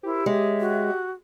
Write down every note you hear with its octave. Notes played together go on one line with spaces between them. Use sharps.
E4 G4 A#4 C5
G#3 C#5 E5
F#4